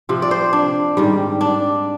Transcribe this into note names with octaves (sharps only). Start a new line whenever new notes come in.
C3 F3 C4
D5
C5
D4
G#2 D#3 G3
D4